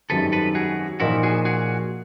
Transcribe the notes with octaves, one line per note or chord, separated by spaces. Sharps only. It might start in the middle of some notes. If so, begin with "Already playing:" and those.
G#1 F#2 D#3 G3 A4 B4
A4 B4
F#4 G#4
A#2 F3 A#3 D#4 E4 F#4
F#4 G#4
F#4 G#4